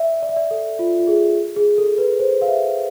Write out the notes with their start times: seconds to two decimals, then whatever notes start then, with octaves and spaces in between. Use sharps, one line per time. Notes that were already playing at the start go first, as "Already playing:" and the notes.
Already playing: D5 E5
0.23 D5
0.29 E5
0.36 D5
0.51 A4
0.79 F4
0.99 F4
1.07 G#4
1.56 G#4
1.78 A4
1.98 B4
2.19 C5
2.42 F5
2.48 E5